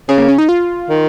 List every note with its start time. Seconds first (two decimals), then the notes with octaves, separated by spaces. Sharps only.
0.09 C#3 G#4
0.18 A#3
0.29 C#4
0.38 D#4
0.49 F4
0.90 D#3